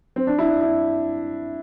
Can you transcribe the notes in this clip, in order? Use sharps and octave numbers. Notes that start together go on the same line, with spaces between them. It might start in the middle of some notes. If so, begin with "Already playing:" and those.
C4
D4
E4
D4
E4